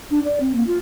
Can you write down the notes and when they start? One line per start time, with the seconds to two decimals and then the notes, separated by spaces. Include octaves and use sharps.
0.11 D4
0.25 D5
0.40 C4
0.55 A#3
0.67 F4